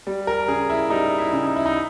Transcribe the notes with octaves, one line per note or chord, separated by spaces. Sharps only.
G3
A#4
C#3 G#4
E4
G3 D#4
E4
C#3
D#4
E4
D#4